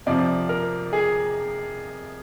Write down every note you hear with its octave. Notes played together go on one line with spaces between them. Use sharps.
F2 C3 F3 D5
A#4
G#4